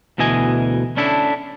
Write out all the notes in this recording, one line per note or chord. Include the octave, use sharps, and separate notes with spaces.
D2 B2 E3 D#5 G#5
C#4 D4 E4 A4